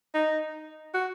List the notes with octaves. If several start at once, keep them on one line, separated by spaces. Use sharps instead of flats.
D#4
F#4